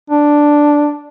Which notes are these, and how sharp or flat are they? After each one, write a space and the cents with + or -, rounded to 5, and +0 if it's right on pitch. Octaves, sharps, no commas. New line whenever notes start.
D4 +0